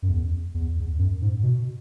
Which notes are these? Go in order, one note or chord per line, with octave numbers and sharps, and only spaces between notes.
F#2
E2
E2
E2
F#2
G#2
B2